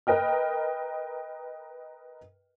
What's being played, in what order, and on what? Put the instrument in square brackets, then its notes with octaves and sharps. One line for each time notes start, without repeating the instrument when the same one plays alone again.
[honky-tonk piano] A#4 B4 D#5 G5 F6